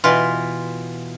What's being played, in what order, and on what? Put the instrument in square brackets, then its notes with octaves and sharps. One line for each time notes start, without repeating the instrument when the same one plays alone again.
[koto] B2 E3 F4